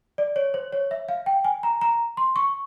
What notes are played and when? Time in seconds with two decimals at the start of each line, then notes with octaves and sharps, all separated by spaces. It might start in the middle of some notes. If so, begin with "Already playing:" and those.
0.18 D5
0.36 C#5
0.54 C5
0.73 C#5
0.91 E5
1.09 F5
1.26 G5
1.45 G#5
1.63 A#5
1.81 A#5
2.17 C6
2.36 C#6